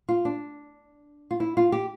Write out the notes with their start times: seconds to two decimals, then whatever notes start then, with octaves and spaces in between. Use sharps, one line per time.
0.09 F4
0.25 D4
1.31 F4
1.40 E4
1.57 F4
1.72 G4